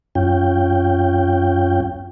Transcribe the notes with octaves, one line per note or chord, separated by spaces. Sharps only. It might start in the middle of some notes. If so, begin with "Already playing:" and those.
F#2 C#4 F4 G5